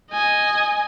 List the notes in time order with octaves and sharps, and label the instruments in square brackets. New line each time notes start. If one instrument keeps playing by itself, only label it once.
[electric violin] D#5 G#5